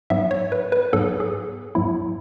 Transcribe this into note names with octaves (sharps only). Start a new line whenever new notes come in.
G#2 F#3 B3 E5
C#5
B4
B4
G#2 F#3 B3 A4
G#4
G#2 F#3 B3 E4